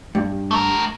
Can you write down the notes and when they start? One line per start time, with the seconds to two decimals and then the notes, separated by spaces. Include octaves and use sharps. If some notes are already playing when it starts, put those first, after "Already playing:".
0.15 G2
0.51 A3 A#4